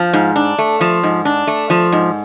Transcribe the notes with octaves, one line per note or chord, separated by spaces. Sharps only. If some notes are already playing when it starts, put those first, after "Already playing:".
Already playing: F3
G#2
D4
A3
F3
G#2
D4
A3
F3
G#2